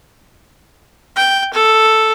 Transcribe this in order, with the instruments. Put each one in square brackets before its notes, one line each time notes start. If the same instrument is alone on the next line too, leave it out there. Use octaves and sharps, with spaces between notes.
[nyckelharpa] G5
A4